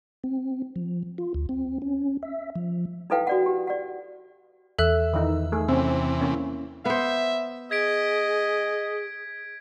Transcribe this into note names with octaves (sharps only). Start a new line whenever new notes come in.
C4
F3
F4
D2
C4
C#4
E5
F3
D#4 E4 A4 B4 F5 G5
F#4 D5 F#5
G4
D5 F#5
E2 A4 E5 E6 F#6
D#3 E3 D#4
A3 G#4
C3 E3 C4 C#4
A#3 C#4 E4
B3 C5 E5
G#4 D#5 G#6 B6 D7